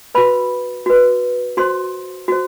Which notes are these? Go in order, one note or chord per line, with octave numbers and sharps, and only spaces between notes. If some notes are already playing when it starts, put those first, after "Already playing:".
F#4 B4 B5
F#4 B4
F#4 C5 C6
F#4 C5